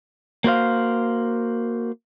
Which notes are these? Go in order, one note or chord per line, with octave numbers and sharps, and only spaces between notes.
A#3 F#4 C5 F5